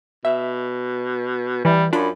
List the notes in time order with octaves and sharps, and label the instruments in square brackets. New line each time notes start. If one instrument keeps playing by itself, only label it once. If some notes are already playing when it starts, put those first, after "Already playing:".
[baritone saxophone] B2 [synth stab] E5
[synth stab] E3 [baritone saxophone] G3
[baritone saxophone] F#2 [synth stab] D4 F4 B5